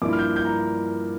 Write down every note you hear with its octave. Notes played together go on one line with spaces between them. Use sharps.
G2 F3 A#3 E4 D6
F6
G6
G6
A#5